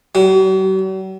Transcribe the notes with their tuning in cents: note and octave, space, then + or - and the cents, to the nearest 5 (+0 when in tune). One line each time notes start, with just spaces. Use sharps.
F#3 +45